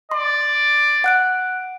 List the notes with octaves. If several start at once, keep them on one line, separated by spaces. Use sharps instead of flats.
D5 C6
F#5 F#6 D7